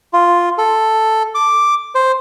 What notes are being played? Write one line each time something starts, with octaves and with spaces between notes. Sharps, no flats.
F4
A4
D6
C5